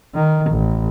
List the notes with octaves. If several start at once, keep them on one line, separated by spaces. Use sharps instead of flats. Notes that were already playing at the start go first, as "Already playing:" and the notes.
D#3
A1